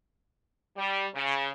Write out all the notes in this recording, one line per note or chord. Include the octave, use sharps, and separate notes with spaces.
G3
C#3